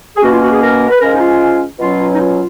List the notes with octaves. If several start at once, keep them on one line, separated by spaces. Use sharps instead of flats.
G#4
B2 A#3 C#4 F#4
F4
F#4
G#4
A#4
B4
F3 G#3 C#4 A#4
D#4
F4
B2 F#3 C#4 F4
D#4
F4